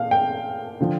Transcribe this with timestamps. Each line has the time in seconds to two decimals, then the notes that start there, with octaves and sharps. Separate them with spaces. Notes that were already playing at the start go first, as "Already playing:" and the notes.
Already playing: A#2 F5
0.11 G5
0.80 D3 F3